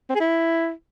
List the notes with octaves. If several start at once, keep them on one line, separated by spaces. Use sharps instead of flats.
C4
G#4
E4